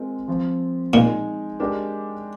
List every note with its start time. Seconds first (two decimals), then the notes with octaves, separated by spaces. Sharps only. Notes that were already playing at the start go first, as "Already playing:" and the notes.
Already playing: G#3 C4 F4 A#4
0.28 F3 C4 F4
0.93 A#2 G#3 D#4 G#4
1.60 G#3 D4 G4 A#4